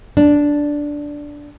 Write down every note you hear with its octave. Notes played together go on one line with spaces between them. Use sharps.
D4